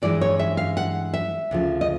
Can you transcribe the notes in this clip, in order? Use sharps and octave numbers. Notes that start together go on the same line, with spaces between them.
G2 E3 G#3 D5
C#5
E5
F5
F#5
E5
D2 C#3 F3
D#5